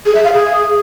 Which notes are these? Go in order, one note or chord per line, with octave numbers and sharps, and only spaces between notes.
G#4
E5
F5
G#4